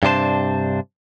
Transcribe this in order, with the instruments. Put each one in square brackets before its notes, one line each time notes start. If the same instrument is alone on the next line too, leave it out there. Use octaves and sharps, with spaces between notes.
[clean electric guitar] G2 C3 D4 C5 A5